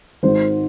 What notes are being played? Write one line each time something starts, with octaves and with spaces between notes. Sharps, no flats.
G#1 G#2 D#3 C5